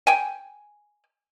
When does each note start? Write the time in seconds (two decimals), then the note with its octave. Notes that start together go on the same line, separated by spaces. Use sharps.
0.07 G5 G#5